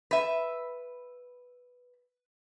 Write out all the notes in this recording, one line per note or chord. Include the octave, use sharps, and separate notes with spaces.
B4 E5